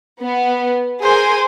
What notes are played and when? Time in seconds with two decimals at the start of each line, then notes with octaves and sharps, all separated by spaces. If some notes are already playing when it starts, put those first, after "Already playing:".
0.21 B3
1.03 G#4 A#4 C5 G#5